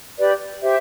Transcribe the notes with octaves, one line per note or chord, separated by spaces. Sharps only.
G4 B4 D5
G4 C5 E5